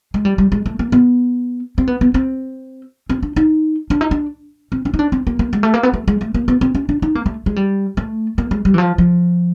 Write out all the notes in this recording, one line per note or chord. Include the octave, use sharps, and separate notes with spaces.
G#3
G3
G3
G#3
A3
A#3
B3
C4
B3
B3
C4
C4
D4
D#4
D4
D#4
D4
C4
C#4
D#4
D4
C4
A#3
A#3
G#3
A3
A#3
B3
A3
G#3
A3
A#3
B3
C4
C#4
D4
D#4
A#3
A3
G#3
G3
A3
A#3
G#3
G3
E3
F3
F3